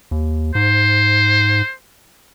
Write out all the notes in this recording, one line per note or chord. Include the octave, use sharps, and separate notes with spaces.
D#2
G#2 C5